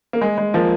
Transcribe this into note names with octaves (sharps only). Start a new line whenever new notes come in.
A#3
G#3
G#3
F3 A#3